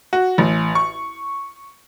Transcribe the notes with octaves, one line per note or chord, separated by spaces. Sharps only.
F#4
A1
C#6